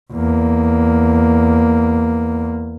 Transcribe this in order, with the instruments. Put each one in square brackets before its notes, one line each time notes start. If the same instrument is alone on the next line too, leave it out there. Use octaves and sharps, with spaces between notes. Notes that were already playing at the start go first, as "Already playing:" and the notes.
[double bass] E2 A#3